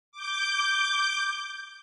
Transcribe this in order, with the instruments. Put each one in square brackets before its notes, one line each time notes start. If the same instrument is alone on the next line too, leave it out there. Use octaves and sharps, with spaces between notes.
[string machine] D6 G6